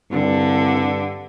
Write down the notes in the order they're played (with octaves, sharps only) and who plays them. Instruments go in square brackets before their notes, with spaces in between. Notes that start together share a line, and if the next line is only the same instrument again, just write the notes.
[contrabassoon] C2 [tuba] G2 [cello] D3